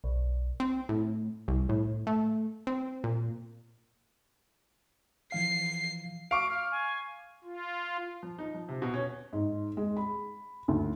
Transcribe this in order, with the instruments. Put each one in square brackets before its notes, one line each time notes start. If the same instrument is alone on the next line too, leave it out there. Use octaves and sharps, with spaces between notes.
[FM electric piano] B1
[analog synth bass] C4
A2
C2
A2
A3
C4
A#2
[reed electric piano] E3 F3 F5 [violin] C7
[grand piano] F5 C#6 D6 [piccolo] D7
[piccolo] F6
G#5
[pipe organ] F4
[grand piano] F3
D#4
F3
C3
B2
C#4
[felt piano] G#2
G#3
B5
D2